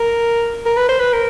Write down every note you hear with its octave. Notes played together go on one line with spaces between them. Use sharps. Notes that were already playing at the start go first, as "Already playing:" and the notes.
Already playing: A#4
A#4
B4
C5
B4
A#4